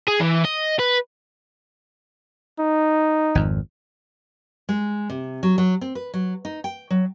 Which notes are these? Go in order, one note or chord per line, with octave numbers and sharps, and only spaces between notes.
G#4
E3
D#5
B4
D#4
G#1 F2
G#3
C3
F#3
F#3
C4
B4
F#3
D#4
G5
F#3